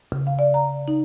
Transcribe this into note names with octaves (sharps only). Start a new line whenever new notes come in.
C#3
F5
D5
A#5
D#4